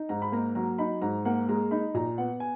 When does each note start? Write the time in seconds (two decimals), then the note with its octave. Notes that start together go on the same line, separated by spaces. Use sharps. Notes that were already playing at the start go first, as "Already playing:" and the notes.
Already playing: D#4
0.09 G#2 A#5
0.22 B5
0.32 A#3 A#5
0.55 F#3 A#5
0.79 D#4 B5
1.02 G#2 A#5
1.25 A#3 F#5
1.49 G#3 A#5
1.71 D#4 B5
1.94 A#2 A#5
2.18 B3 F#5
2.40 G#5